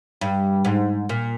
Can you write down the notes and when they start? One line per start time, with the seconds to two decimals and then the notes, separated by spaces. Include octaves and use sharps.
0.21 G2
0.65 G#2
1.09 A#2